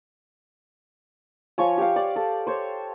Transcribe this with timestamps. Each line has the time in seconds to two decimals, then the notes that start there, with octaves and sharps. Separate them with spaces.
1.58 F3 C#5 G#5
1.78 G4 F5
1.96 D5
2.16 A4
2.47 C5 C#5